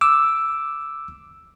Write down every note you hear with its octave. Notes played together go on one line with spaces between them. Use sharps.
D6 E6